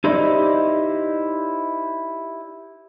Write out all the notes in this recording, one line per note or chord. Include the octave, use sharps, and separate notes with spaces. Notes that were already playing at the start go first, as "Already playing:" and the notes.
D#4 E4 G4 C5 D5 D#5